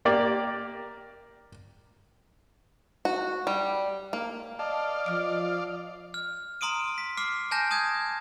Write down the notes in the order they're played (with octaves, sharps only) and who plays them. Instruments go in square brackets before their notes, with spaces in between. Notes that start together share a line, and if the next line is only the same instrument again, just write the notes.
[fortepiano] A#3 G4 D5
[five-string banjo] F#4
G3
A#3
[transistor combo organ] D5 F5 [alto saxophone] D#5 [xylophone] A5
[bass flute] F3 [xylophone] D6 F6 D7
[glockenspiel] F6
A#5 C6 D#6 D7 D#7
B6
D6 F6 C7
G#5 A5 F6 G6 A#6 E7
A5 D#6 G6 G#6